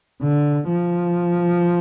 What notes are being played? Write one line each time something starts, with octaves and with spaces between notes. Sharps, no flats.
D3
F3